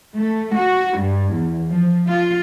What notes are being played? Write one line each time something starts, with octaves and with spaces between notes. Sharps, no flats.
A3
F#4
G2
E2
F3
F4